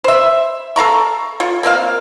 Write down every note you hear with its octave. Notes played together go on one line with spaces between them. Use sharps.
C5 E5
A4 F5 A#5 C#6
F4 C#5
A#3 C4 A4 F5